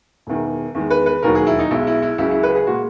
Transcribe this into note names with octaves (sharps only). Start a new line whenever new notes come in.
E1 E2 D#3
E2 D#3 G#3
B4
B4
E1 D#2 D#3 F#3 A#4
G#4
E4
D#4
B1 B2 G#3 E4
E4
E4
C#2 C#3 F#3 E4
E4
B4
G#4
A#2 G#3 F#4